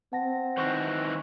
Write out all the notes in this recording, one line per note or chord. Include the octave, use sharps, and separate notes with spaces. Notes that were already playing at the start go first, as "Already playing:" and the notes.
C4 F#5 A5 A#6
D#3 E3 C5 C#6 F#6 A#6